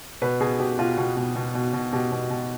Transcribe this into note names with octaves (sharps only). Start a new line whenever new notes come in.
B2 B4
B2 G#4
B2 G4
B2 F4
B2
B2
B2
B2
B2
B2 G4
B2
B2